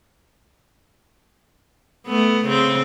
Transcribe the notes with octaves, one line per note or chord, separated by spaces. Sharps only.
A3 B3
C#3 C4